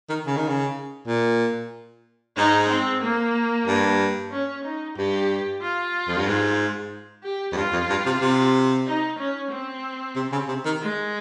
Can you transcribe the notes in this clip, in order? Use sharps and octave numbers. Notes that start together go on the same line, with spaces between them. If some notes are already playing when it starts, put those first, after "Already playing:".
D#3
C#3
D#3
C#3
A#2
G#2 D#4
C4
A#3
G2
C#4
D#4
G2 G4
F4
F2
G2
G#2
G4
F2
G2 F4
F2
G2
C3
C3
D#4
C#4
C4
C3
C#3
C3
D#3
G#3